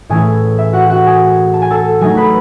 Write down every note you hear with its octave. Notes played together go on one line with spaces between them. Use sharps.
A2 E3 A3 C#4 E4 G#4 G#5
E5
F#4 F#5
F#4 F#5
G#4 G#5
A5
G#5
A4 A5
F#3 A3 D#4 G#4 G#5
B4 B5